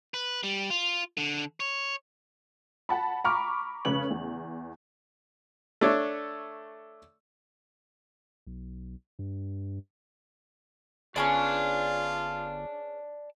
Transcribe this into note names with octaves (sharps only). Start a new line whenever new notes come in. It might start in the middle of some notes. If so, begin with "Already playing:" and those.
B4
G3
F4
D3
C#5
F#5 A5 B5
A#5 B5 C#6 D6 F6
F1 C#3 C#4 B4 F#7
E2
A3 D4 C#5
B1
G2
G1 C#4 F4 G#4 B4 D5 A5